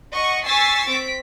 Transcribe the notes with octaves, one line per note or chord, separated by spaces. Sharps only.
D#5 F#5 C#6
G#5 C#6 E6 A6 B6 C7
C4 B6 D7